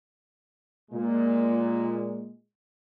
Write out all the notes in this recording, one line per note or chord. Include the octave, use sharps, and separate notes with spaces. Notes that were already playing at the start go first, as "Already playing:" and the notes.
A#2 G#3